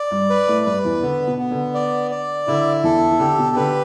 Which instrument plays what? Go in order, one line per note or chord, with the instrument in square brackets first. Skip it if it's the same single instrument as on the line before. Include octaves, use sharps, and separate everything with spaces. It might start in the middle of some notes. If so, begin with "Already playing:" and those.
Already playing: [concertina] D5
[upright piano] G2 G3
[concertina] B4
[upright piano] A2 A3
[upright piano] G2 G3 [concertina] B4
[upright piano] E2 E3
[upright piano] D3 [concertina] B3
[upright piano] B2
[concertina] B3
[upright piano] D3
[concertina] D5
D5
[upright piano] D3 [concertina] E4
[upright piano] E2 E3 [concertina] A4
[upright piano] E3
[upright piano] D3 [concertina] G4
[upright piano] B2
[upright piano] D3 [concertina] B4